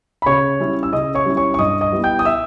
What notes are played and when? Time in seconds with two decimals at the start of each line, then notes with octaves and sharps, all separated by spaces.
0.22 B5
0.26 C#3 C#5 C#6
0.60 G3 C#4 E4
0.83 E6
0.93 C#3 D#5 D#6
1.15 C#5 C#6
1.26 G3 C#4 E4
1.37 C#5 C#6
1.54 C#6
1.59 G2 D#5 D#6
1.81 D#5 D#6
1.92 G3 B3 E4
2.04 G5 G6
2.19 D#6
2.25 E5 E6